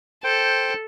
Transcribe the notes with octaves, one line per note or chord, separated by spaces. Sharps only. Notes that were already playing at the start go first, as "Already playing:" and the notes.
A4 C5 G5